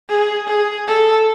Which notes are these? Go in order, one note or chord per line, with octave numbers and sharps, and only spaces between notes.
G#4
G#4
A4